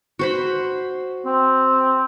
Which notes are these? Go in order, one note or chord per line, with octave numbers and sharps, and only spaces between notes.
F#4 C5 B5
C4